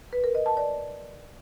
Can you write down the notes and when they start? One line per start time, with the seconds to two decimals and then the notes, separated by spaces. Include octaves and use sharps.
0.13 B4
0.24 A#4
0.35 D#5
0.46 A5
0.57 D5